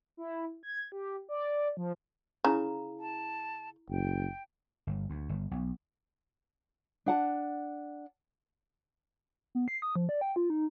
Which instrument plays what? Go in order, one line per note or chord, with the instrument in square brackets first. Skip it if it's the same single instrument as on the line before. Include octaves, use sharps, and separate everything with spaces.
[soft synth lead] E4
G#6
G4
D5
F3
[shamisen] C#3 [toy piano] E4 A#5
[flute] A5
[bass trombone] F#1 [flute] G5
[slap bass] G1
D2
G1
B1
[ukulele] D4 F#5 A5
[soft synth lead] B3
C7
D#6
F3
D5
G5
F4
D#4